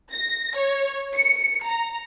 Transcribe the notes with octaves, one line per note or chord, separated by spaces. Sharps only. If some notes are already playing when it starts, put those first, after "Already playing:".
A#6
C#5
C#7
A#5